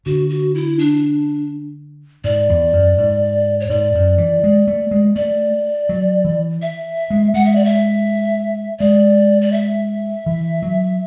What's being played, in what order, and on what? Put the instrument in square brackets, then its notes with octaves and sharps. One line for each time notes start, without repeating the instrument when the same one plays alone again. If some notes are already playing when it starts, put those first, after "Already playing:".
[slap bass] D3 [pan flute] F#4
[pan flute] F#4
E4
D4
[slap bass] G#2 [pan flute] D5
[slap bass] E2
F#2
G#2
[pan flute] C#5
[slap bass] G#2 [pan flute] D5
[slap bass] F#2
E3
G#3
A3
G#3
[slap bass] A3 [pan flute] D5
[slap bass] F#3
E3
[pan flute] E5
[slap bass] G#3
[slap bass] G#3 [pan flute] F#5
[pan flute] E5
D5
E5
[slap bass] G#3 [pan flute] D5
[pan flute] D5
E5
[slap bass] E3
F#3